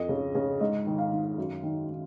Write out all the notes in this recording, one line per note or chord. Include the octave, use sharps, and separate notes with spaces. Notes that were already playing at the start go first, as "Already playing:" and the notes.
Already playing: F2 D#5
C#3
C#3
G#2 D#5
D#3
F5
D#3
F#2
D#3
D#3